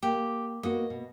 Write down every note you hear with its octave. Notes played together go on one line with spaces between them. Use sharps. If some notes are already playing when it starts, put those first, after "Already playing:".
A#3 G4
A#3 B3 F#4 D#5
B2